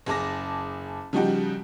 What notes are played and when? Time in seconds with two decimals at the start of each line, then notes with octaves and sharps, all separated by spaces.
0.06 F#1 G#4 A5 D6 A#6
1.13 C#3 F3 G3 D#4 F#4 G4